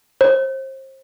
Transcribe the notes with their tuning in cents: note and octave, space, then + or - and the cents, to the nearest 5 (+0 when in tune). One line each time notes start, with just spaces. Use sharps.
C5 +35